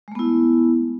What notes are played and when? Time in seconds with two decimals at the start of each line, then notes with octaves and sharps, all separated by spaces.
0.08 G#3
0.12 A3
0.15 B3
0.19 E4